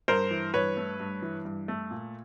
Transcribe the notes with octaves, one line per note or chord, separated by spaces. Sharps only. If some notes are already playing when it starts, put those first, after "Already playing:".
G2 A#4 C5
E3
G2 B4 C#5
A3
G2
E3
G2
A3
A#2